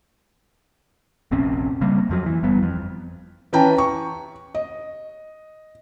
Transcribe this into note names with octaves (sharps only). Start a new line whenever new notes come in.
F1 A#1 C4 C#4
C#3 G3 A#3 C4
F2 F3 F#3
E3
G1 G3 B3
F2
E3 C#4 B4 G5 A5 A#5
C#6
D#5